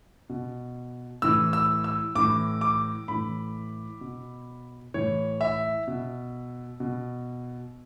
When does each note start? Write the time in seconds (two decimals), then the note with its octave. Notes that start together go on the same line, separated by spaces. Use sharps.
0.29 B2
1.22 A2 E3 E6
1.53 E6
1.84 E6
2.15 A2 E3 D6
2.61 D6
3.08 A2 E3 B5
4.01 B2
4.94 A2 E3 C#5
5.41 E5
5.88 B2
6.80 B2